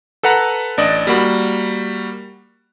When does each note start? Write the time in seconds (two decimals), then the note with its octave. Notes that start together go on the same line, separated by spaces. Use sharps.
0.23 A4 B4 F#5 A#5
0.77 A1 D4 D5 D#5
1.07 G3 A#3 F#4 B5